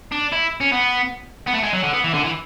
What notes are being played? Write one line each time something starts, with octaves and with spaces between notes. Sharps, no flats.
D4
E4
C#4
B3
B3
A3
G#3
F#3
D3
B3
E3
D3
E3